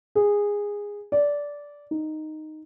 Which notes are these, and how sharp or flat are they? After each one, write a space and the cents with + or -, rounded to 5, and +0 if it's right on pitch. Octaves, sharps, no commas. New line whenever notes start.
G#4 -15
D5 -15
D#4 -5